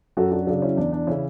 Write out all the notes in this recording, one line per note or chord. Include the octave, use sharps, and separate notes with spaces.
F#2 F#4 A4
D4 F#4
C#3 F#3 D4
C#4 E4
E2 D4
D4
C#3 E3 C#4 E4